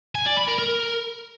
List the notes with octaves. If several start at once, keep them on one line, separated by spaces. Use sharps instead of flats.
G#5
D5
B5
A#4
A#4